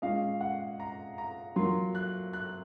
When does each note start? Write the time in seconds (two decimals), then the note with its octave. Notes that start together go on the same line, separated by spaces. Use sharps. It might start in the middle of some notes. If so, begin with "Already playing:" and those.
0.02 A#2 G#3 C#4 F5
0.41 F#5
0.80 A#5
1.18 A#5
1.56 F#3 A#3 F4 C6
1.95 F#6
2.33 F#6